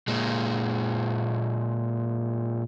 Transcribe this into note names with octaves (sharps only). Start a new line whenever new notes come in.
A#2 G#3